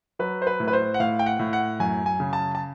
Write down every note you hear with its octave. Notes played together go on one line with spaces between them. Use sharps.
F#3 B4
C5
B4
A2
B4
C5
F#5
A2 F5
G5
F#5
A2
F#5
F#2 G#5
G#5
C#3
A5
A5